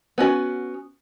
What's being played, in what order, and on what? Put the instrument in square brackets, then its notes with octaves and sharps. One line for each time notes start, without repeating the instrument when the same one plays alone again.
[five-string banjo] B3 C#4 F#4 G#5